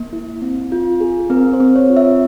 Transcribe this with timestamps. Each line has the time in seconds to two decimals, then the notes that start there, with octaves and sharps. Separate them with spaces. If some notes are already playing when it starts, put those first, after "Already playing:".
Already playing: A#3
0.13 E4
0.42 C4
0.72 F4
1.01 G#4
1.30 C4 A#4
1.53 C5
1.60 C4
1.76 C#5
1.90 F4
1.97 E5